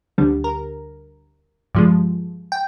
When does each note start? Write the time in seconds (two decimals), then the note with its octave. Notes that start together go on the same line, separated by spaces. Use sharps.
0.18 D2 D3 G3
0.44 A#4
1.75 G2 F3 G#3
2.52 G5